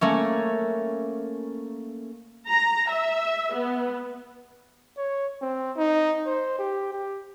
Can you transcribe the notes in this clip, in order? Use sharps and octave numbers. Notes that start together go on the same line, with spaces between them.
A3 A#3 C#4
A#5
E5
B3
C#5
C4
D#4
C5
G4
G4